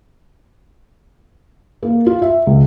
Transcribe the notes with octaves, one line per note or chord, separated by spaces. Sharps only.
A#3
F4
E5
C#2